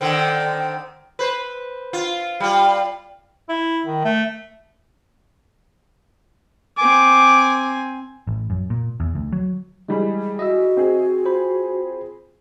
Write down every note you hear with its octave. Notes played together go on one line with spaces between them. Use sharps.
D3 D#3 C4
B4 C5
F4
G3 F4
E4
D#3
A3
C4 G#5 D6
A1
F#2
A#2
E2
D2
F#3
E3 G3 G#3 G#4 B5
F#4 D#5 E5 E6
C4 G#4
F4 C5 B5